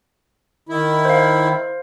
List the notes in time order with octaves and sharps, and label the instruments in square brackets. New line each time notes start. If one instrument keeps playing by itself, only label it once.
[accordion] D#3 E4
[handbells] C5 F5